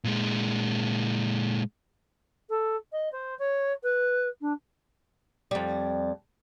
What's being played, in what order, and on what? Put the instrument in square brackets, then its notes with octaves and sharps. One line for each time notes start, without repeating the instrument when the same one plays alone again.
[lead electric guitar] A#2 G#3
[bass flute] A4
D#5
C5
C#5
B4
D4
[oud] F2 G3